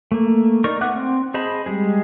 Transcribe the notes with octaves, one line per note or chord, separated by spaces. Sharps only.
A3 A#3
D#4 A#4 D5 C#6
B3 E5 F#5 D6 F#6
C4
G#4 C5 D#5 A5 B5
G3 G#3 G#4